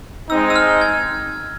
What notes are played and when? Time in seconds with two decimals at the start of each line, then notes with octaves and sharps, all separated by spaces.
0.30 G#3 C4 D#4 E6
0.50 E6
0.56 F6
0.81 G#6